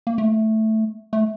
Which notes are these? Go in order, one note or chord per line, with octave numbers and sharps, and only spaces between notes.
A#3
A3
A3